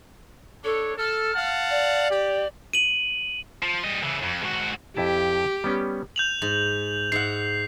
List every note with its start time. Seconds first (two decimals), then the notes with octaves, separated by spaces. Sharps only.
0.64 D4 A4 C#5
0.98 A4 F6
1.34 F5 F#5 A5
1.70 D5
2.11 G4
2.73 D#7 F#7
3.63 F3
3.84 G3 D#5
4.03 C#3 E3
4.23 F2
4.43 G#2 F#4
4.97 F2 E4 G4 A5
5.64 G3 B3 C#4
6.16 G6 F7 F#7
6.42 G#2
7.12 G#2 E5 F#5 C7